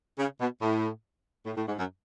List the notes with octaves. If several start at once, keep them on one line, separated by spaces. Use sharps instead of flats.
C#3
B2
A2
A2
A2
G#2
F#2